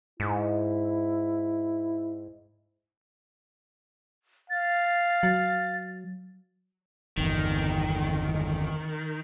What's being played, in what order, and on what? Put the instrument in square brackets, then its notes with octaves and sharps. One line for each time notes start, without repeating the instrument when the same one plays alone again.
[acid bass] G#2 [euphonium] E4
[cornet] F5 [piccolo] A6
[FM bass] F#3
[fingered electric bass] G1 E2 [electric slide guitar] D#3